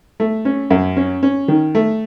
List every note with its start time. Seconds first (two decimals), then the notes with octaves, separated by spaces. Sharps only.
0.20 A3
0.45 C#4
0.70 F#2
0.96 C#4
1.23 C#4
1.48 D#3
1.75 A3